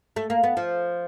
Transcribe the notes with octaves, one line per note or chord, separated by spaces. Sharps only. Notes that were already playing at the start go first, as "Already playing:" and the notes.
A3
A#3
B3
F3